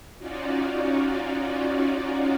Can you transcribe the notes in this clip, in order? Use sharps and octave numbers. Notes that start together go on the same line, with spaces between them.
C#4 D#4 F4 F#4 D5